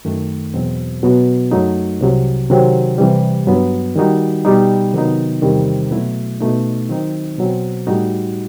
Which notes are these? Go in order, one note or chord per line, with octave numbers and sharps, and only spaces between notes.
F#2 D#3 A3
E2 B2 F#3 C4
B2 F#3 B3 F#4
F#2 F#3 A3 D#4
C2 C3 F#3
C3 D#3 F#3 C4
C3 E3 G3
G2 F#3 B3
D#3 G3 D#4 F#4
B2 G3 D#4
C3 D#3 F#3 B3 D#4
E2 C3 D#3 G3 C4
B2 F#3 A3 E4
B2 A3 D#4
D#3 F#3 C4 D#4
B2 F#3 C4
A2 G3 D#4 F#4